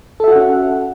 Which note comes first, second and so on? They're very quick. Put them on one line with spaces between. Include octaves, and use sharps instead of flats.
A4 E5 F#4 F#5 C#4